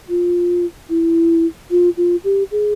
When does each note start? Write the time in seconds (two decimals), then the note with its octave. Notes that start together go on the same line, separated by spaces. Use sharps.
0.09 F4
0.89 E4
1.71 F4
1.97 F4
2.24 G4
2.51 G#4